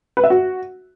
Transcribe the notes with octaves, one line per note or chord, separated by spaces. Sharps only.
B4
E5
F#4